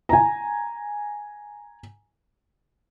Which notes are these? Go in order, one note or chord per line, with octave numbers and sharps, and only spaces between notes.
G#5 A#5